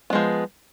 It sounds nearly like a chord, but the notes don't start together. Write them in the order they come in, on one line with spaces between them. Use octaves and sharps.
B3 G#3 F3